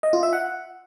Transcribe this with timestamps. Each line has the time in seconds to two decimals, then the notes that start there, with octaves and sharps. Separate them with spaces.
0.03 D#5
0.13 F4
0.23 E5
0.33 F#5